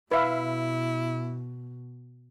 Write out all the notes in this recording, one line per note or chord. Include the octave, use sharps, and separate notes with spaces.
B2 E4 B4 E5 F5